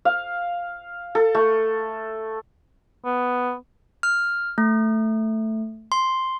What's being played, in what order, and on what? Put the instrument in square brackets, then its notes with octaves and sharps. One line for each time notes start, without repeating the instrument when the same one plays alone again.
[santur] F5
A4
A3
[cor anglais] B3
[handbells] F6
A3
C6